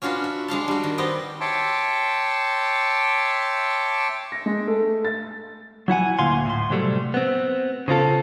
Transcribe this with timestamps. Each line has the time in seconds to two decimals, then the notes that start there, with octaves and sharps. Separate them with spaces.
0.02 C#4 D4 F4 F#4 B4
0.24 E5
0.48 G#3 D4 F5 A5
0.68 G3 F#4
0.84 D#3
0.98 B3 C4 G4 D#5
1.41 C#5 E5 G5 A5 C6 D6
4.32 A#6
4.46 G#3
4.68 A3
5.05 A6
5.88 F#3 E4 F#5 G#5
6.19 D2 A#2 F5 G#5 C6
6.46 A2 C6
6.70 C3 F#3 G3 A3
7.14 B3 C4
7.88 C#3 C4 F4 A4